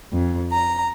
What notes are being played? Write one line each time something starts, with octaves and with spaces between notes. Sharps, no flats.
F2
A#5